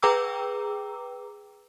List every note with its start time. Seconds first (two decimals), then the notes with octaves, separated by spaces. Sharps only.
0.02 G#4 B4 G5 A#5 D6 E6